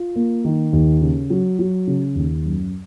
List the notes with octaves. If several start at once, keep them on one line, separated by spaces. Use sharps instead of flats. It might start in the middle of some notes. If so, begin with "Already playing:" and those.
Already playing: F4
A#3
D#3
D#2
C#3
F#3
F#3
C#3
D#2
F#2